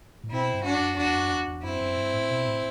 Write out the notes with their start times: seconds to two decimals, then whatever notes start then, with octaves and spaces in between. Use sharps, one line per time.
0.23 A2
0.32 B2 C4 E4
0.54 G2
0.65 D4 F#4
0.75 F#2
0.97 E2 D4 F#4
1.15 F#2
1.31 E2
1.48 E2
1.64 F#2 C4 E4
1.81 F#2
1.97 G2
2.14 A2
2.30 B2
2.47 A2